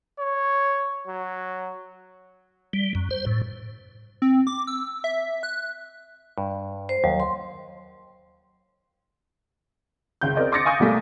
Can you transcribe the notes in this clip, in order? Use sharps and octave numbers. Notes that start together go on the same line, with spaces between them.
C#5
F#3
G3
F#2
C5
A2
C4
D6
E6
E5
F#6
G2
C5
D#2 F#3
C6
F#1 C#2 G6
C4 A#4 D5 D#5
C6 D6 D#6 A6 A#6 C#7
F5 G#5 C#6 D#6 G6
B1 G3 A3 A#3